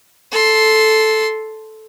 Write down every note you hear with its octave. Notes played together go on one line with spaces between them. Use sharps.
A4 C6